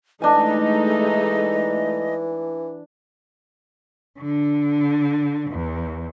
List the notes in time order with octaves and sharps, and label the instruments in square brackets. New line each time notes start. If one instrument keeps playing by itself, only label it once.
[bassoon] E3 [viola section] G#3 A3 D#4 [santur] D4 G#5 [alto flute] D#5
[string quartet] D3
E2